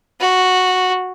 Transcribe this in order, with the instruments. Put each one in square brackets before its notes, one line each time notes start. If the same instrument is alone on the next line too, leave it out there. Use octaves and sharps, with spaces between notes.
[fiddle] F#4